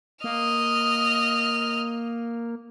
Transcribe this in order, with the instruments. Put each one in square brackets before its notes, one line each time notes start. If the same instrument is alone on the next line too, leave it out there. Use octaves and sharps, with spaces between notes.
[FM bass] A#3 [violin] D#5 F6